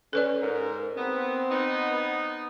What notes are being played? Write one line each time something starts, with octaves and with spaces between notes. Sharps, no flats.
C#4 A4 B4 D5
G#2 A#4
B3 C4
B3 D#4